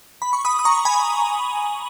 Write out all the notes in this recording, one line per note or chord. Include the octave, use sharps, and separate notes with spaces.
B5
C#6
B5 D#6
D#6
A#5 C#6
G#5 B5